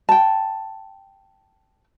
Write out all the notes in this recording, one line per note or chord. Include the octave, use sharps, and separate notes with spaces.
G5 A5